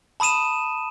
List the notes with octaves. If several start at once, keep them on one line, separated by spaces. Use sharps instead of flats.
A5 B5 D#6 D#7 E7